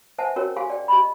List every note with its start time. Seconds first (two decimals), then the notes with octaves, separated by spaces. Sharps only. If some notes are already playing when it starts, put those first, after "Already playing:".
0.18 B4 C5 E5 F#5 G#5 A5
0.36 C#4 F#4 A#4 C#5 G5
0.56 G4 G#4 F5 G#5 C6
0.70 D5 G5
0.88 G4 D#5 B5